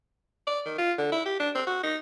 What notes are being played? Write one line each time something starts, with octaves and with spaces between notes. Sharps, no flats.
D5
D#3
F4
D3
E4
G4
D4
C4
F#4
D#4